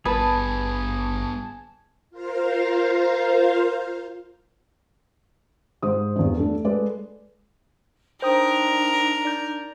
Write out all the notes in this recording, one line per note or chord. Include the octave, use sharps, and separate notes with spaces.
G#1 G2 B3 G#4 B4 A5
F4 A#4 C5 F5
G#2 C5 D#6
E2 G2
A3 D4 A4
G#3 A4 B4 D5
D4 D#4 A#4 C5 G5 D#6
D5 G6